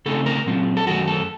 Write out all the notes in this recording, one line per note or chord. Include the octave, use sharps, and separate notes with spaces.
C#3 A3 C4 D#4 A4
A#4
A#2 F#3 C4 F4
A4
F#2 D#3 A3 F#4
A4